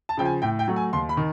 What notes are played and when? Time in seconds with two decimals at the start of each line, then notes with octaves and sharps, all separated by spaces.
0.09 A5
0.17 C#3 F3 G5
0.25 G#5
0.42 A2 G5
0.59 G5
0.68 F#3 A3
0.76 G#5
0.93 D#2 C6
1.09 B5
1.17 D#3